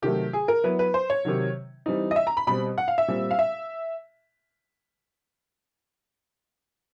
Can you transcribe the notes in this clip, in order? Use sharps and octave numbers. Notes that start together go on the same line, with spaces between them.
C3 D#3 F#3 A3 G4
G#4
A#4
F#3 B3 E4 B4
B4
C5
C#5
C3 D#3 F#3
E3 G3 C4 D#4
D#5
E5
A#5
B5
B2 G3 C4 B5
F#5
F5
E5
A#2 G3 C4
F5
E5